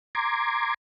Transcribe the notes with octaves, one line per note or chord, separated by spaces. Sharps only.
A#5 C6 D6 G#6